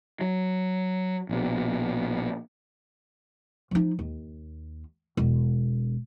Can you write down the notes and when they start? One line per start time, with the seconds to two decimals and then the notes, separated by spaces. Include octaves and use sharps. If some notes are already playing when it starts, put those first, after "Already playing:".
0.21 F#3
1.29 A#1 B2
3.71 F3 D#4
3.99 D#2
5.17 E1